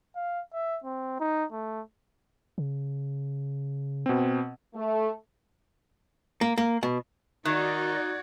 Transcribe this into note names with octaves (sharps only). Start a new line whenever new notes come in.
F5
E5
C4
D#4
A3
C#3
B2 C4
A3
A#3
A#3
B2
D#3 D#4 F#4 D5 F#6 G#6